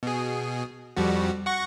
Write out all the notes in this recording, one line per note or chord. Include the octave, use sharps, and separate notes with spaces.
B2 G#4
F2 G3 F#4
F#5 C#6 A#6